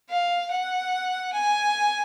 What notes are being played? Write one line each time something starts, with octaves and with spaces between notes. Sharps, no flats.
F5
F#5
G#5